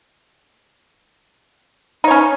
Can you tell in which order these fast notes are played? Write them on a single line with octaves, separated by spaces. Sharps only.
D#4 C#5 C#4